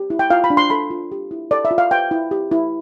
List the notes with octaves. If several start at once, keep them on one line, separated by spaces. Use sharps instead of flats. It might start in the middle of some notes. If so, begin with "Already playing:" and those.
Already playing: G4
E4
G5
F4 F5
B5
D4
C6
A4 B5
F4
G4
E4
A4 D5
E5
F4
F5
B4 G5
E4
G4
E4